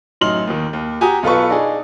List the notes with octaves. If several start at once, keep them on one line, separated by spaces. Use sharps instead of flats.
A1 F#3 D#4 C6 F6 F#7
D#2 D#3
D#2
F#4 G4 G#5 A#5 D#6
B1 F4 A4 B4 C#6
D4 D#4 G#4